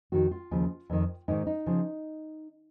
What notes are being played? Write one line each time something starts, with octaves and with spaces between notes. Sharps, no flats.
F2 D#3 F#4
F4
D#2 C#3 F3
F2 D#3
G#2 D#3 D#4
D#4
C#3 F3